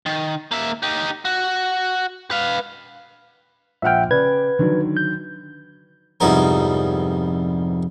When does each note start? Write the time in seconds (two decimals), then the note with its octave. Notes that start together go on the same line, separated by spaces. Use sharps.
0.06 D#3
0.51 A#3 E5
0.83 D#4 G4
1.25 F#4
2.31 B4 F5
3.82 A#1 E5 F#5 G5 F6
4.11 C#3 B4 D5 G#6
4.59 D3 D#3 F#3
4.97 G6
6.20 C2 F2 G#2 G3 B3 A#4